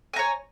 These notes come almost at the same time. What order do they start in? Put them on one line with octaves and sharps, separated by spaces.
G#5 A#5 C#5